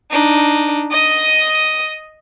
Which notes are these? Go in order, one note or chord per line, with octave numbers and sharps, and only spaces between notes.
D4 D#4
D#5 D#6